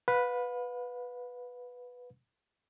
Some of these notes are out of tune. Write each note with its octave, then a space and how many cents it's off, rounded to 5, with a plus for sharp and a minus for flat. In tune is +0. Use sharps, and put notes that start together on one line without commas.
B4 +0 F5 +45